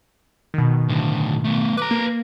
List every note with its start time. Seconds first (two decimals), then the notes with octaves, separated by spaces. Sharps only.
0.54 B2 D#3
0.89 A2 D3
1.44 A3 B3
1.77 B4 A#5 D6 F#6
1.91 A#3